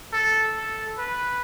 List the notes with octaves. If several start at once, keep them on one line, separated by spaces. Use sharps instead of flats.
A4
A4
B4